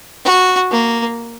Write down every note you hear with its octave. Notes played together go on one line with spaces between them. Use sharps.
F#4
A#3